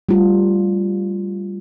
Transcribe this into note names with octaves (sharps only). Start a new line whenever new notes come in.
G3 A3 F4